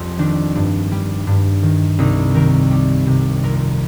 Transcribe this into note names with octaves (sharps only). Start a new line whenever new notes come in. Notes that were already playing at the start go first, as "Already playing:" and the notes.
Already playing: F2 G3 G4
D#3 D4
G2
G3
G2
D#3
C2 D#4
D#3 A#4
G3
C3
F2 A#4